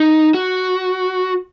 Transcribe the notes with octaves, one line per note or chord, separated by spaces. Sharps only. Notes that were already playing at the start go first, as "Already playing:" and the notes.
Already playing: D#4
F#4